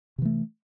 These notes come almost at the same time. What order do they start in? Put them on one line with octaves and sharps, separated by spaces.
C3 E3 A3